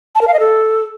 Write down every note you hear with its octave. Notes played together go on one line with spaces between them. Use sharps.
A5
A#4
F5
D#5
A4